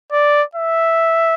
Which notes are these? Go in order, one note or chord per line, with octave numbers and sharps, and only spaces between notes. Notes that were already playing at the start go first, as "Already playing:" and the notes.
D5
E5